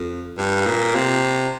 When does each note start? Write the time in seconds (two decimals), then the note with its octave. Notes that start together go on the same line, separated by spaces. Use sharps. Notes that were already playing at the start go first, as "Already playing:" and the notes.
Already playing: F2
0.38 G2
0.66 A#2
0.95 C3